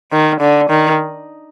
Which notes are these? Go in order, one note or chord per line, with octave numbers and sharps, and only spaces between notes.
D#3
D3
D#3